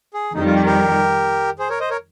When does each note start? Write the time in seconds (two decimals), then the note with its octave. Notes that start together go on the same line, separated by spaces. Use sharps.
0.14 G#4
0.34 F2 D#3 G3 D#4
0.45 F4
0.55 G4
0.66 G4 A#4
1.59 G#4 C5
1.70 A#4 C#5
1.80 C5 D#5
1.90 A#4 C#5